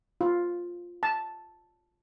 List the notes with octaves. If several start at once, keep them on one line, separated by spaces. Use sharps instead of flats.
F4
A5